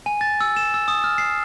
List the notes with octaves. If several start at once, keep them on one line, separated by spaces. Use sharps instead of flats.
G#5
A6
E6
E7
E6
D#6
F6
C7